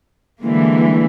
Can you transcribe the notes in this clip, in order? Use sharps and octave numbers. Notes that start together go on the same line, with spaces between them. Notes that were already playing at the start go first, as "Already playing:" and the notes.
D3 E3 G3 G#3 A#3